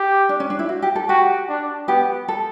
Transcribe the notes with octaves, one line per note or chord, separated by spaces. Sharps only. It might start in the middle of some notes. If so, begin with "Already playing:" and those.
Already playing: G4
D4
C#4
D4
E4
F#4
G4
A4
F#4 G4
D4
B3 G4
A4